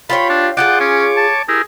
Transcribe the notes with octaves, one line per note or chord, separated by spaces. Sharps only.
F4 G4 C#5 B5
D4
F4 F#4 G#4 D5 F#5 G5 D6
C#4 C#5 D6
A5
E4 G4 G#4 A#4